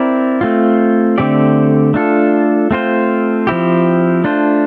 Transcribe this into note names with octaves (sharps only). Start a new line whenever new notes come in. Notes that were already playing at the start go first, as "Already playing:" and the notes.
Already playing: C4 E4 A#4 D5
A3 C4 F4
D3 A3 C4 G4 D5
A3 D4 F4 A4
A3 C4 F4 C5
F3 C4 E4 G4
A3 D4 F4 C5